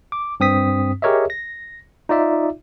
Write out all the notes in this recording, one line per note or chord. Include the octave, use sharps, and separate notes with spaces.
D6
G2 C4 D#6 B6
G4 G#4 A#4 C#5 D#5 E5
A#6
D#4 F4 D5 E5